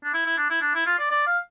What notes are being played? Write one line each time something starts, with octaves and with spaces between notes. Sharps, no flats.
D4
E4
E4
D4
E4
D4
E4
F4
D5
D5
F5